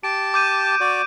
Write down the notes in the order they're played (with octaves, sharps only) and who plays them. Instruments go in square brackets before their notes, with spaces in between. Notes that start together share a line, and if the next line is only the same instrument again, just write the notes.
[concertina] G4 A5 [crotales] D7
[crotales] D6 G6 D#7
[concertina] F#4 D5